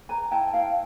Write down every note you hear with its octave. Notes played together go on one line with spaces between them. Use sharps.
B4 G#5 A#5
E4 G5 A5
E4 F5 G5